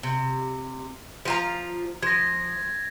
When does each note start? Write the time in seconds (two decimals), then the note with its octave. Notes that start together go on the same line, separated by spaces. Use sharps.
0.03 C3
1.25 F3 F4 A#5
2.03 F3 G#6 A#6